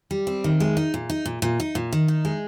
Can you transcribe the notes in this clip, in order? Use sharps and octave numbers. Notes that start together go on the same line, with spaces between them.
G3
C4
D#3
G#3
D#4
A#2
D#4
A#2
A#2
D#4
A#2
D#3
D#4
G#3